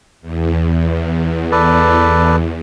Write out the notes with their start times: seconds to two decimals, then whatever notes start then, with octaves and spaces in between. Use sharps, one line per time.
0.22 E2
1.52 A4 B4 D5